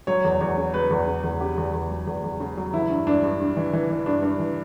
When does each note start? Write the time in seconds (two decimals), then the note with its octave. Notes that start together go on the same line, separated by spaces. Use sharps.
0.07 F#3 C#5
0.25 E2
0.41 E2 C#5
0.57 C#3
0.74 F#3 B4
0.91 E2
1.07 C#3
1.24 E2
1.40 C#3 G4
1.58 E2
1.73 E2
1.90 F#3
2.07 E2
2.24 E2
2.40 C#3
2.57 F#3
2.74 E3 E4
2.90 G2
3.07 G2 D4
3.23 G2
3.40 G2
3.57 E3
3.73 E3
3.90 E3
4.06 G2 D4
4.23 G2
4.40 E3